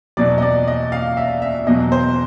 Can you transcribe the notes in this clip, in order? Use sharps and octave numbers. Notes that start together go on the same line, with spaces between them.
E2 B2 F#3 D5
D#5
D5
D#5
F5
E5
E5
E2 B2 F#3 D#5
C5